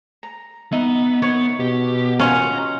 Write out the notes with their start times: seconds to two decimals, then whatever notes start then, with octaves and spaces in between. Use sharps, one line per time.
0.23 A#5
0.72 B3 D#4 D#5 E5
1.22 B3 C#5
1.60 B2 G4
2.19 C#4 F4 D#5 F#5 A#5